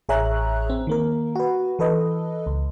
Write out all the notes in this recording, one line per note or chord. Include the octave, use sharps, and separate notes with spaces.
A1 G#4 C#5 E5 A#5 F#6
C4
D#3 A#3 A#4
F#4 B4
E3 A4 B4 D#5
C#2